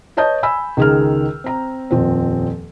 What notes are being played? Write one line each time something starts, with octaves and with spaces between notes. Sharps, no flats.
B4 C#5 D#5 A5 D#6 G6
G#5 B5 E6
C#2 D#3 G#4 A#4 F6
C4 A#5
D#1 F2 F3 C4